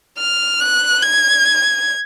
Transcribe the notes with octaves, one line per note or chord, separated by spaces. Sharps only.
F6
F#6
G#6